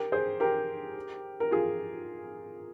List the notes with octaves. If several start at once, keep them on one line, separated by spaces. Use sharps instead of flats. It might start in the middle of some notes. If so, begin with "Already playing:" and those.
Already playing: G4 A#4
G#4 C5
G4 A#4
A#4
F4 G#4